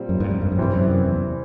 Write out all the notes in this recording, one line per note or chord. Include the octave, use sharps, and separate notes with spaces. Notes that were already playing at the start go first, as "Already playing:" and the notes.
Already playing: A#2 G3 C4
F#2
G2
F#2
G2
F#2
G2 C3 E3 G3 C4
F#2
E2